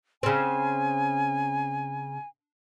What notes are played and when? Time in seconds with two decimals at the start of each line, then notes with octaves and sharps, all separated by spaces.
0.23 C#3 C4 G#5